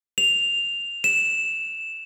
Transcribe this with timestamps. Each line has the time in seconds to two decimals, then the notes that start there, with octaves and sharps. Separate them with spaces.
0.18 F7
1.04 E7